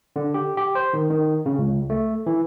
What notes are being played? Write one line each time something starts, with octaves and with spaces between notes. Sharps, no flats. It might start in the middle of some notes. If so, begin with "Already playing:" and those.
D3
G4
G4
C5
D#3
D#3
C#3
C#2
A3
E3